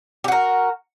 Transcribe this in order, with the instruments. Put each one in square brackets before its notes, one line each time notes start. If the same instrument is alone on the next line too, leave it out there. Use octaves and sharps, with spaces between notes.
[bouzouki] G4
F#4
A#4